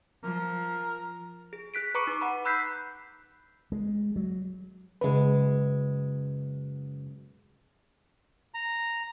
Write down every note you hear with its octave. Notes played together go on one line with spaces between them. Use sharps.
F3 A#4
G#4
G#4 F#6 B6 D7
B4 A#5 B5 C#6 D6 C#7
D#4 D6
F#5 A#5 B5
B5 E6 F#6 G6 B6 C7
G#3
F#3
F#2 C#3 G#3 B4
A#5